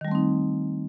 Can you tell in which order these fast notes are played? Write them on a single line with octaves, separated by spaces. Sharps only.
D#3 G3 A3 C4 D#4